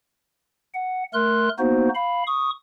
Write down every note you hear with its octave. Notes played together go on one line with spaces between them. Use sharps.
F#5
A3 A#4 C6 F#6
A#3 B3 D#4 F#4 C5
F5 B5
C#6 D#6